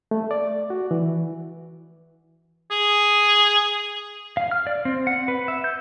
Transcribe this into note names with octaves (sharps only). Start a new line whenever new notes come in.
A3
D5
F#4
E3
G#4
F5
F6
D5
C4
F#5
B4
E5
G6